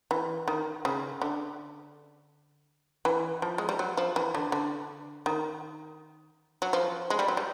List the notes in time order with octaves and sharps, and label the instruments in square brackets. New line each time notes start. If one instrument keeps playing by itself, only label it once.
[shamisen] E3
D#3
C#3
D3
E3
F3
G#3
G3
F#3
F3
E3
D3
D3
D#3
F#3
F3
G#3
G3
F#3
G3